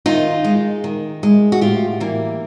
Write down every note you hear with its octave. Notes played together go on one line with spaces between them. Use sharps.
D#3 D#4 F4
G#3
D#3
G#3
F#4
A2 F4 G4
E3 G3 A#3